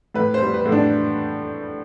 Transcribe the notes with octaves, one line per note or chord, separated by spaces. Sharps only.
A2 B4
C5
G3
B4
A2
D4